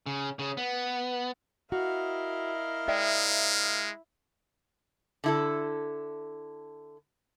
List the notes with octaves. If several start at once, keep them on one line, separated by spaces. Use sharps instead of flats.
C#3
C#3
B3
E4 F#4 A#4 D#5 F5
G#3 D5 E5 G5
D3 E4 A4